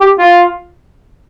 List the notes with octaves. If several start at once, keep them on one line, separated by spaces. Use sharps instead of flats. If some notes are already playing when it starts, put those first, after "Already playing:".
G4
F4